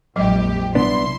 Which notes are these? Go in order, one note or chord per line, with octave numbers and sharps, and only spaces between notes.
A#1 F2 F#3 G#3 G4 D#5
C2 B3 D4 E4 C6